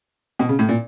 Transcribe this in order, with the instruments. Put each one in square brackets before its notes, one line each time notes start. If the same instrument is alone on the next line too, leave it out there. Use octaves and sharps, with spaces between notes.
[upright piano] B2
C#3
A2
A#2